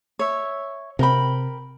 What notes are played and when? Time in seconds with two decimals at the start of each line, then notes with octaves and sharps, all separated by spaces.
0.19 C#5 E5
0.99 C3 A#4 G5 B5